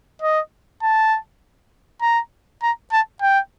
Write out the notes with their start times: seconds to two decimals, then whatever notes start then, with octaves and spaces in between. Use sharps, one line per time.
0.22 D#5
0.82 A5
2.02 A#5
2.62 A#5
2.92 A5
3.21 G5